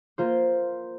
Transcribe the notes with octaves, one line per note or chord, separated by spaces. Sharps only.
A#3 F4 C5